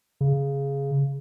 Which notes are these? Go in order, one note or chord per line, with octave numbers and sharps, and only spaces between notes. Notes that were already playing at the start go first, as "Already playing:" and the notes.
C#3